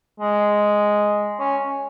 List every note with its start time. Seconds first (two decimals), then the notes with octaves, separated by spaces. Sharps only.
0.20 G#3
1.39 C#4